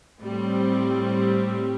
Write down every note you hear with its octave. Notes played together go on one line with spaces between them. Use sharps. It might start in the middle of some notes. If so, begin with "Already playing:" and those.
A2 G3 C4